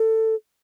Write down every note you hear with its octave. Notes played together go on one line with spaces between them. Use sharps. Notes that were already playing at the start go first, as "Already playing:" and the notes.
Already playing: A4